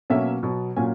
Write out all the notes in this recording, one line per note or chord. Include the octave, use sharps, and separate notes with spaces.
B2 F#3 A#3 C#4 E5
B2 F#3 B3
A#2 F#3 A#3 C#4 G#5